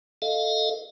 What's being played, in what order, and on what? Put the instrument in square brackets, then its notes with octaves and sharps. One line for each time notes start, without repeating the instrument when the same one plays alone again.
[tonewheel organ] A4 D#5 F5